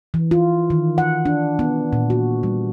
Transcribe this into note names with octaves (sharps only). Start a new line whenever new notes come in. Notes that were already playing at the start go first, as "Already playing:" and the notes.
E3
F4
D#3
F#5
D4
B3
A#2
F#4
G3